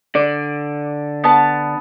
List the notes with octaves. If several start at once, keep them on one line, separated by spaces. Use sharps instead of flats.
D3 D5
B3 A5